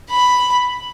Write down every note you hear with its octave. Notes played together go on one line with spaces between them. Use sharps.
B5